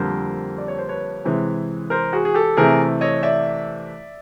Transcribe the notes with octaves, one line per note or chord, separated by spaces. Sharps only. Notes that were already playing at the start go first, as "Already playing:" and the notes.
Already playing: F2 D3 G3 A#3 A#4 C5
D5
C#5
C5
B4 C#5
C3 E3 G#3
A#4 C5
F#4 G#4
G#4
G4 A4
C3 E3 A3 G#4 A#4
C#5 D#5
D5 E5